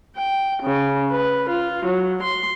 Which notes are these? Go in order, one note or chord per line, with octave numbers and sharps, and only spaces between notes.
G5
C#3
B4
F4
F#3
C6